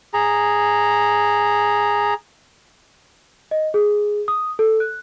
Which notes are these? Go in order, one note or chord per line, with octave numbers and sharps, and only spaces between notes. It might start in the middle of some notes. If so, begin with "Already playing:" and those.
G#4 A#5
D#5
G#4
D#6
A4
F#6